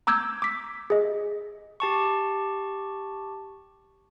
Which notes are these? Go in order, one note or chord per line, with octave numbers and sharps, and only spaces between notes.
A#5 D6 E6 G6 G#6
D6 B6
G#4 D#5
G4 A5 C#6